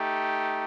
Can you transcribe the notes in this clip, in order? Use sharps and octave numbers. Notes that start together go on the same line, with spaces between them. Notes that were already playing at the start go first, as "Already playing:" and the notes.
Already playing: A3 D#4 G4